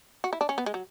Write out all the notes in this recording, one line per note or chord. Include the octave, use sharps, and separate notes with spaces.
F#4
E4
D4
C#4
B3
G#3
F#3